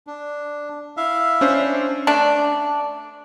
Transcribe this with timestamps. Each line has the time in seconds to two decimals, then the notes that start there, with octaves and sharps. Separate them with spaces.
0.07 D4
0.97 E4 E5 F5
1.41 C#4 D4 C5
2.07 A3 D4